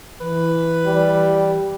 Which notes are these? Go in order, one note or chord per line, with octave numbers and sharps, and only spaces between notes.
E3 B4
G3